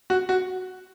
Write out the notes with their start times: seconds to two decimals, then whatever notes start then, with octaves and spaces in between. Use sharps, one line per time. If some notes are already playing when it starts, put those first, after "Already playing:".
0.10 F#4
0.29 F#4